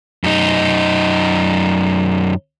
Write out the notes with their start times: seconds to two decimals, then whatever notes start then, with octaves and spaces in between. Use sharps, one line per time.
0.24 F#2 D#4